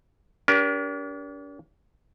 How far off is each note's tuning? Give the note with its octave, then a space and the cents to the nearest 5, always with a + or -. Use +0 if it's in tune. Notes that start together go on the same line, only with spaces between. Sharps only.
D4 -45 G4 +0 A#4 +30